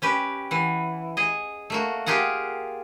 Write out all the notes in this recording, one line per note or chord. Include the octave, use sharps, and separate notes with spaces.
C#4 G4 B4
E3 F#5
G#4 D#5
A3 A#3 F#4
F4 G4 G#4 A#4 F#5